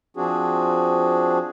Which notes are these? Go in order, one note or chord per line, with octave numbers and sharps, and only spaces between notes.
F3 C4 D4 F#4 G#4